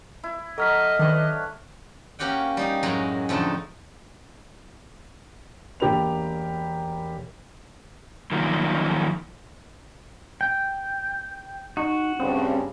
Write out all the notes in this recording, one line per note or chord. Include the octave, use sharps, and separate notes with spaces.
E4
F#3 A4 D#5 F6 B6
D#3 D4 B4 C#5
A#3 C#4 F#4 G4 F#5 G5
G3 D#4 G4
F#2 A2 F#3 G#3 G#5 A#5
F2 D3 A3 D#4 A4
E1 A#3 G4 A#4 B5 F7
D#3 F3 F#3 A#3
G5
D#4 F#4
D2 G2 C#3 C4